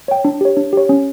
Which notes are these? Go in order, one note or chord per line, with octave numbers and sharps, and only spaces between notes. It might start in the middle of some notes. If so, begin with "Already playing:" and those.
C#5 G5
D4
G4 C#5
D4
G4 C#5
C#4